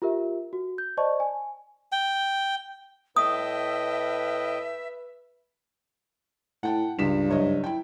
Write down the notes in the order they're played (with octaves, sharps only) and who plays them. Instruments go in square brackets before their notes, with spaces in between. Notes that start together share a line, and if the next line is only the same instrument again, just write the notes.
[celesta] F4 G4 A#4 E5
F#4
G6
C5 D5 D#5 A5 C#6
G#5
[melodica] G5
[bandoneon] A2 D#5 G5 [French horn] B4 [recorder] E5 [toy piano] D#6
[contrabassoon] A2 [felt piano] F#5 G5 A5
[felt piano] C#2 B6 E7 [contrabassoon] G2
[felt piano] F#1 C#5 D#5
E4 G5